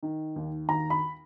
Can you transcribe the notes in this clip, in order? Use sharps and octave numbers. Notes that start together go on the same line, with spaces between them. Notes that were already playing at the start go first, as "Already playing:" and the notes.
D#3
D#2
D#2 A#5
B5